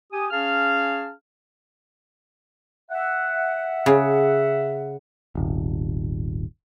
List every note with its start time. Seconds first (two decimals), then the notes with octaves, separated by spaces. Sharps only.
0.12 G4 G#5 D#6
0.31 C#4 G#4 F5 A5 F6
2.91 E5 F#5
3.86 C#3
5.35 D#1 G#1